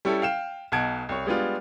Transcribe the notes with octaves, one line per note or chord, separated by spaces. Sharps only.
G3 C#4 E4 A4
F5 G5 E7
B1 B2 F#5 A5 G#6 D7
C2 C#5
G3 G#3 B3 D4 F4